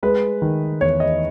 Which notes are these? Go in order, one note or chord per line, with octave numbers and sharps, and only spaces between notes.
G#3 B4
D#3
E2 C#5
D#5